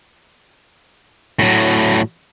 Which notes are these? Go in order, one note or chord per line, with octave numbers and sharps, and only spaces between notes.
A2 F#3